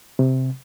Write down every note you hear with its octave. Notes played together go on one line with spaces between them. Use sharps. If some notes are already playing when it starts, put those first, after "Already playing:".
C3